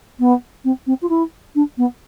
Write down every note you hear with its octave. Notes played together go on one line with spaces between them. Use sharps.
B3
C4
C4
F4
E4
D4
B3